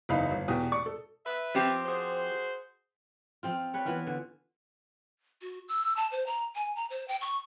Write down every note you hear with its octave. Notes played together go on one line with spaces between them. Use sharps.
F#1 E2 D#4 F5 B5
G1
E2 B2 G4 D#6
D5 C#6
A4
B4 E5
F3 C4 G4
F#4 G#4 C5
F3 C4 F4
G3 B4 C#5
E3 B3 E4 F4
D3
F#4
E6
A5
C5
A#5
G#5
A#5
C5
G5
C#6